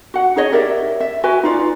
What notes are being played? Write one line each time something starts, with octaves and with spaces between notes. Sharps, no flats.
F#4 F#5
D#4 G#4 C#5 D#5
G4 A#4 D5 E5
E5
F#4 B4 G#5
D#4 F4 D5